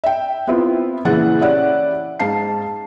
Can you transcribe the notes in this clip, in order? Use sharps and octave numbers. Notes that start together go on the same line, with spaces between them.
E5 G5
B3 C4 E4 F4
A#2 C#3 E3 F#5 A6
C#4 E4 G4 D5 F#5
G#2 F5 A5 C7